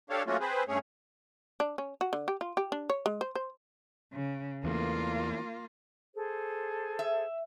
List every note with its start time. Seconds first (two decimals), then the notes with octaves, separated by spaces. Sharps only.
0.10 D4 G4 A4 C#5 F5
0.26 F#3 A3 A#3 C#4 F4 F#4
0.40 C4 G#4 B4 C5
0.68 G2 A3 C#4 G#4 C#5
1.60 D4
1.78 C#4
2.01 F#4
2.13 D3
2.28 G4
2.41 F4
2.57 G4
2.72 D4
2.90 C#5
3.06 G#3
3.21 C5
3.35 C5
4.13 C#3
4.64 E2 E3 A3 A#3 F4
6.15 G#4 A4 C5
6.99 E5